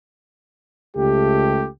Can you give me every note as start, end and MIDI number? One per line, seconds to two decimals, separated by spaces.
0.96 1.67 37
0.96 1.67 57
0.96 1.67 67